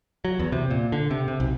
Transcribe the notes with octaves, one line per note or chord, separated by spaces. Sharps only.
F#3
E2
C3
A#2
D3
C3
C3
B1